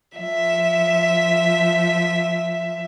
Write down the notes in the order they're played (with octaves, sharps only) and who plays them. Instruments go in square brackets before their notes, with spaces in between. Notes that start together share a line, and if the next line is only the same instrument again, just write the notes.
[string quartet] F3 E5